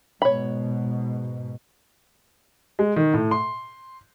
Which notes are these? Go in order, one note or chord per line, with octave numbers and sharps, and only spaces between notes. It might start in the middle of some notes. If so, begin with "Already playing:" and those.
G#2 B2 C#5 B5
G#3
D#3
A2
C6